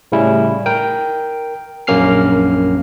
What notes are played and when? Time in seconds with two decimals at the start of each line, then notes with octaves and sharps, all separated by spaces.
0.12 A2 C#3 G3 C#4 E4
0.66 A#4 G5
1.87 A#1 F#2 A#3 C#4 F6 C7